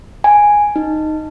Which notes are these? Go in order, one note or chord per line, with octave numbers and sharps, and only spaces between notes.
G#5
D#4